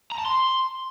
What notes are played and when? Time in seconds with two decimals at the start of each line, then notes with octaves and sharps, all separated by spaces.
0.12 A#5
0.18 A5
0.25 C6